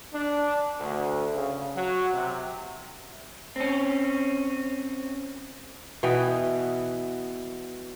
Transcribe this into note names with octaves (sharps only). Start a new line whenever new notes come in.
D4
D2
C#3
F#3
C3
C4 C#4
B2 E3 B3 G5